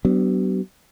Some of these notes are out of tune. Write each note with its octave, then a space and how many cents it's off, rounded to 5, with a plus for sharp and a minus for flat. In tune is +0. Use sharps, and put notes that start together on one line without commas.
F#3 +45 B3 +15 D4 +0